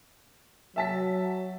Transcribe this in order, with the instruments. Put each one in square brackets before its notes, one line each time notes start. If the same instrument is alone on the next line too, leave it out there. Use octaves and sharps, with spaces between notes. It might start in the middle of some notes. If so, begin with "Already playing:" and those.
[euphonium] F#3 [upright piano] E5 A5 B6